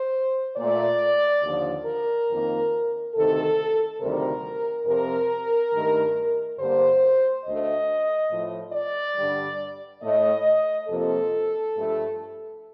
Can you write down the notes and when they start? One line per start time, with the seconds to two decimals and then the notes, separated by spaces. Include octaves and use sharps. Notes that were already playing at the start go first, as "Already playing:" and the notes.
Already playing: C5
0.57 A#2 A3 D5
1.43 D#2 D3 F3
1.86 A#4
2.29 F2 D#3 A#3
3.15 D2 C3 D#3 A4
4.01 D2 C3 D#3 G3 A#4
4.86 F2 C3 F3 A#4
5.73 G2 D#3 A3
6.59 G2 D3 G3 A#3 C5
7.44 D2 D3 A3 D#5
8.31 A2 F3 A3
8.73 D5
9.16 G2 D3 G3
10.02 A2 A3 D#5
10.88 F2 C3 F3 A#3 A4
11.74 G2 F3 A3